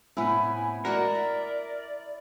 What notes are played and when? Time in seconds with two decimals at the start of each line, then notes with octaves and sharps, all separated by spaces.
0.17 A2 C3 B3 E4 G#5
0.85 G#3 A#3 F#4 A#4 D5
1.15 E5